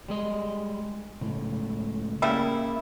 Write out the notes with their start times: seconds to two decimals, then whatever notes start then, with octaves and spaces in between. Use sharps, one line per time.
0.08 G3 G#3 D#5
1.21 C#2 A2 C3
2.22 C#3 G3 A#3 E4